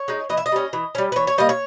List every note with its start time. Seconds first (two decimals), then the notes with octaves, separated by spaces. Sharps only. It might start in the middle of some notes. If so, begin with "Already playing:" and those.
Already playing: C#5
0.08 G#3 D#4
0.29 E3 D#5
0.37 E5
0.46 D#5
0.52 G3 C#4
0.73 E3
0.95 G3 C#4
1.12 B4
1.16 E3 C#5
1.27 C#5
1.38 G3 A#3 D#5
1.49 C#5